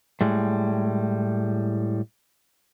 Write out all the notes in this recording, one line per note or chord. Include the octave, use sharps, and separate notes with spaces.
A2 G3 G#3